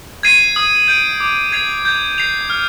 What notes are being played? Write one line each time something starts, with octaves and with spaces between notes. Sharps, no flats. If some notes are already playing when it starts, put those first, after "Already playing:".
G#6 C7 D#7
D#6
G6 D7
D6
G#6 C7 F7
G6
C7 F7
F6